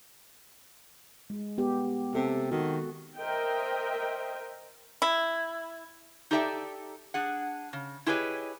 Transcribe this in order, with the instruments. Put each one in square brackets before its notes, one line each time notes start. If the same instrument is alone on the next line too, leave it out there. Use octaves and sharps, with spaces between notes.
[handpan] G#3
B3 G4
[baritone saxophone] C3 [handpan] A4
[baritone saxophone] D#3 [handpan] F#4
[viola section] A#4 C5 D#5 E5 G5
[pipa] E4
[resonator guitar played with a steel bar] D#4 G4 A4 D5 E5 G5
D4 G#4 F#5
C#3
E4 G4 G#4 B4 C#5 D#5